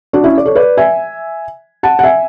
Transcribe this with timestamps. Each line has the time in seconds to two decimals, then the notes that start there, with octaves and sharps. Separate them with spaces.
0.13 D4 F#4
0.24 C#4 E4
0.38 D5
0.45 A4 C#5
0.55 B4 D5
0.77 E5 G#5
1.83 F#5 A5
1.99 F#5
2.04 E5 G#5